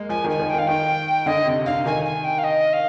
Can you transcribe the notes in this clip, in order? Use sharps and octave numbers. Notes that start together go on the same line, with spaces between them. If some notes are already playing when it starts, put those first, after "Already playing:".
Already playing: G#3 A#3
F3 G#5
D#3
G#5
D#3
G5
D#3
F5
D#3 G5
D3 D#5
C3
D3 F5
D#3 G#5
G#5
G5
F5
D#5
F5